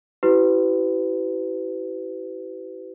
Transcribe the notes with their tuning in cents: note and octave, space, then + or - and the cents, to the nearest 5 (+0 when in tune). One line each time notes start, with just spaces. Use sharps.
E4 +0 G4 -40 B4 +30